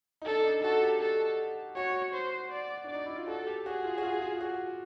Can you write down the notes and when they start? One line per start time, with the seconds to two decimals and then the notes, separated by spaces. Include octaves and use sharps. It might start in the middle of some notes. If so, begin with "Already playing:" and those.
0.22 D#4
0.26 D4 A4
0.40 D4
0.44 D#4
0.64 F#4 A4
0.83 G4
1.02 A4
1.76 F#4 C#5
2.14 C5
2.52 D5
2.84 D4
2.90 D#4 D5
3.06 E4
3.16 F4
3.27 F#4 A4
3.46 G4
3.66 F#4 G#4
3.84 F4
3.98 F#4
4.03 F4
4.22 F4
4.41 F#4